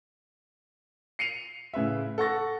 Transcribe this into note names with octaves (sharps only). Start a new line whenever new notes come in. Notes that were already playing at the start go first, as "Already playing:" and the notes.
C7 C#7 D#7 F7
A2 C#3 B4 E5
A4 F#5 C#6 A6 A#6